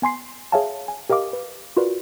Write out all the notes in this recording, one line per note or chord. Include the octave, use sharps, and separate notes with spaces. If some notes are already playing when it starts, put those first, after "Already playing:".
B3 G#5 C6 C7
G#4 C#5 E5 F5 G#5 A5
G#5
G4 A#4 D#5 F5 D6
B4
F4 F#4 A#4 B4 D5